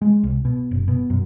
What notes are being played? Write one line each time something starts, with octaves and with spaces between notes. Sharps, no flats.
G#3
C2
B2
F#1
B2
F#2